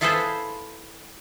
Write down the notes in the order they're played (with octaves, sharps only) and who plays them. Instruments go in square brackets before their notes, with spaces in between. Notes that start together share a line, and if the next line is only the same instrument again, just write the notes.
[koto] E4 F4 G#4 A4 B4 C5